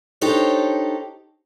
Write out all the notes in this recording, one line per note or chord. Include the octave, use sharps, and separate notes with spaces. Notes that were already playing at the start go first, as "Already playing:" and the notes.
D4 D#4 G4 A4 C5 C#5